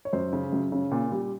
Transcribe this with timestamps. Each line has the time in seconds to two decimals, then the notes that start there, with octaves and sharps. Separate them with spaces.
0.05 C#5
0.13 F#2 C5
0.33 C#3
0.52 F#2
0.72 C#3
0.91 A#2
1.11 G3